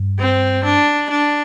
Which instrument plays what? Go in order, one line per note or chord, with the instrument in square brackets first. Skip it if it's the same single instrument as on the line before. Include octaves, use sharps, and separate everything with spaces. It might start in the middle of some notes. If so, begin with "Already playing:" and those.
Already playing: [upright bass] G2
[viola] C4
D4
D4